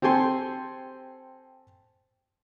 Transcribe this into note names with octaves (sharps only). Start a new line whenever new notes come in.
C4 G4 A4 G#5 C6